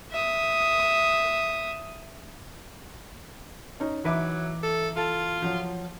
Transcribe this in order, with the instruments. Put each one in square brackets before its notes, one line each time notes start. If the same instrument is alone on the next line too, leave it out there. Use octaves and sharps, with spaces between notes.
[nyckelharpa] E5 D#6
[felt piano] C#4 D#4
[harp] E3 B4 D7 [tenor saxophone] F#3 [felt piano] D#4 E5 D6
[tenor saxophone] A4
[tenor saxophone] F4 [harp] A4
[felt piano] F3 F#3